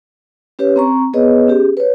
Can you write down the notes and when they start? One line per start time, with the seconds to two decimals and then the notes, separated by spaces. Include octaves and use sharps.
0.59 C#4 G4 B4 C#5
0.76 C4 A#5 C#6
1.14 B3 G#4 B4 C#5 D#5
1.48 C#4 G4 G#4
1.77 B4 C#5